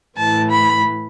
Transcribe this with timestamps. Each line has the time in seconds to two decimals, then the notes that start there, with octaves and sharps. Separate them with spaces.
0.17 A2 E3 A5
0.50 B5